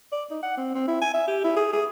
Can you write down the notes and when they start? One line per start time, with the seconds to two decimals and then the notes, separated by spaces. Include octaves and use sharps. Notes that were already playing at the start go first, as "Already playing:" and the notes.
0.12 D5
0.31 D#4
0.43 F#5
0.57 C4
0.75 C4
0.88 E4
1.01 G#5
1.14 E5
1.28 G4
1.44 E4
1.56 G#4
1.73 G#4